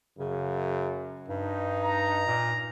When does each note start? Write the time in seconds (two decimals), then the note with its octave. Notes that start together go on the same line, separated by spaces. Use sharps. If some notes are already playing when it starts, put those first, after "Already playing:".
0.18 F#2 C#3
1.29 G2 D#4
1.84 A#5
2.26 A#2